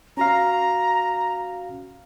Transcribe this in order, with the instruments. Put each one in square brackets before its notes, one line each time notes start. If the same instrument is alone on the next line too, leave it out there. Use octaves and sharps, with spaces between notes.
[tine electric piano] C#4 F#4 F5 [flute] A#5